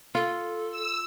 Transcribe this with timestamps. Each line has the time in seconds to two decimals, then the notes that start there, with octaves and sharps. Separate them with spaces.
0.15 F4 A4
0.71 E6